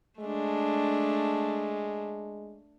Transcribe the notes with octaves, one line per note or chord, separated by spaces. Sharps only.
G#3 A3 D4